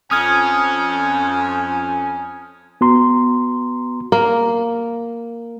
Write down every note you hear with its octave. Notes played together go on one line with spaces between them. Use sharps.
F2 C#4 G#5 D#6 F6 G#6
B3 F#4 A#5 C6
A#3